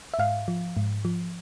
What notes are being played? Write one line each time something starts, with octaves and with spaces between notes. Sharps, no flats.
E5
G#2 F5
F3
G#2
F3